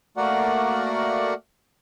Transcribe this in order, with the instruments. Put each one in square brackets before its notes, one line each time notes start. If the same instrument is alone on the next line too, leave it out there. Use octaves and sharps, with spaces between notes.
[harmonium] A3 A#3 F#4 A#4 D5 F#5